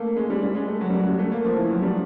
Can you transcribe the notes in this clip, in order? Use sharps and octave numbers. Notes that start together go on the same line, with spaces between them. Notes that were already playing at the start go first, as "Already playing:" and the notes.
Already playing: A3 A#3
G#3
G3
G3
G#3
A3
F#3
G3
F#3
G3
A3
A#3
F3
E3
F#3
G3